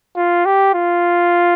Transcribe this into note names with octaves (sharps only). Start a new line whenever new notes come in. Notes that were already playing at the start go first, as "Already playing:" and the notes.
F4
G4
F4